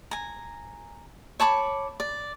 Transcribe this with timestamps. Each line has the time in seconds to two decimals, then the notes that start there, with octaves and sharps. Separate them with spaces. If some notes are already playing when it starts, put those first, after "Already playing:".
0.11 G#5 A#5
1.40 C#5 A5 B5 D6
2.00 D5